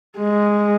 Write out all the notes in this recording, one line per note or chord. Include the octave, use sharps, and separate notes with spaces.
G#3